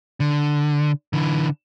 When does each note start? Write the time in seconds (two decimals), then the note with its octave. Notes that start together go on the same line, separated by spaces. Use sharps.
0.20 D3
1.13 D3 E3